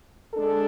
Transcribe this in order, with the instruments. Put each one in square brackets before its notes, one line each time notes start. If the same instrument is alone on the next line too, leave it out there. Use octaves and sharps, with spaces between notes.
[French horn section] G#3 D4 A4